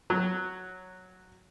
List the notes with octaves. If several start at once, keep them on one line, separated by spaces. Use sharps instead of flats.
F#3